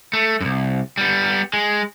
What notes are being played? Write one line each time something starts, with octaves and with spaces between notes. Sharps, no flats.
A3
C2 F#2
G3 B3
G#3